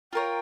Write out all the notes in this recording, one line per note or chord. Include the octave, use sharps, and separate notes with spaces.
F4 A#4 C#5 G5